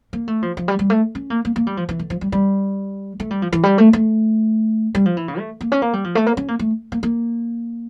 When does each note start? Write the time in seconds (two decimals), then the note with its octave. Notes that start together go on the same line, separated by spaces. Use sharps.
0.13 A#3
0.28 A3
0.42 F3
0.57 F3
0.68 G3
0.79 G3
0.90 A3
1.15 C#4
1.30 A#3
1.45 A#3
1.56 A#3
1.67 G3
1.77 F3
1.89 E3
1.99 D3
2.10 F3
2.21 G3
2.32 G3
3.20 A3
3.31 G3
3.42 F3
3.53 E3
3.63 G3
3.78 A3
3.93 A3
4.95 G3
5.06 F3
5.17 E3
5.28 C#3
5.38 A3
5.61 A#3
5.72 C#4
5.82 A#3
5.93 G3
6.04 F3
6.15 A3
6.26 A#3
6.37 C#4
6.48 A#3
6.59 A3
6.92 A#3
7.03 A#3